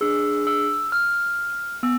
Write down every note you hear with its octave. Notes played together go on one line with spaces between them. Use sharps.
D4 G#4 E6
E6
F6
B3 E6